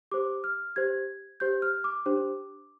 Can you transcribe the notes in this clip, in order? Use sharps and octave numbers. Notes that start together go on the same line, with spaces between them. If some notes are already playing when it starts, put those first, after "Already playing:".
G4 C5 D6
F6
G4 C5 G#6
G4 C5 G6
F6
D6
D4 G4 C5